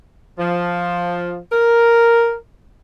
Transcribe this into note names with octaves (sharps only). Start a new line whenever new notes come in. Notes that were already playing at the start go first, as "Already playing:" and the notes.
F3
A#4